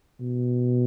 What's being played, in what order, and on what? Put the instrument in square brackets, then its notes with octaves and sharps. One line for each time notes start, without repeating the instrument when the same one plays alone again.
[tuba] B2